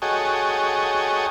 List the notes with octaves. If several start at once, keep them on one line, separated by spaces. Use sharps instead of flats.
F#4 G#4 A4 C#5 D#5 G5